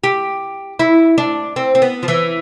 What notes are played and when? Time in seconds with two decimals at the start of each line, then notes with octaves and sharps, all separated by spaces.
0.04 G4
0.79 E4
1.18 D4
1.56 C4
1.75 C4
1.82 B3
2.03 F3
2.08 E3